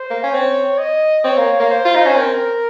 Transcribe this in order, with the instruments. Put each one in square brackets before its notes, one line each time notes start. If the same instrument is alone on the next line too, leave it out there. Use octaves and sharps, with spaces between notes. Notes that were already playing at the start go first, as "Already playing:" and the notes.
Already playing: [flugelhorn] C5
[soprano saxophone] A#3
C#4
[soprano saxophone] C4 [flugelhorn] C#5
[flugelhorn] D#5
[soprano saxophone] C4 [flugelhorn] C#5
[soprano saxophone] A#3
A#3
[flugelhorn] C5
[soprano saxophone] F4
D#4
C#4
[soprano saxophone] C4 [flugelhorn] A#4